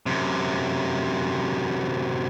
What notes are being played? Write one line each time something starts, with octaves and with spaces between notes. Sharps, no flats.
F#2 C3